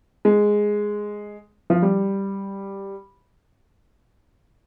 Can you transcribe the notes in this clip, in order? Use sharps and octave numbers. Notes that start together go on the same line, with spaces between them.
G#3
F3
G3